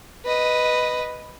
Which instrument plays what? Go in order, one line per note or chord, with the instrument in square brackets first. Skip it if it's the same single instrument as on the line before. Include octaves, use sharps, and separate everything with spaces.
[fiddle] B4 D#5